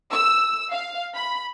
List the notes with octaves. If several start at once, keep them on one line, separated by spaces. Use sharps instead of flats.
E6
F5
B5